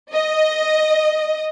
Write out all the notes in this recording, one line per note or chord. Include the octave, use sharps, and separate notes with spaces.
D#5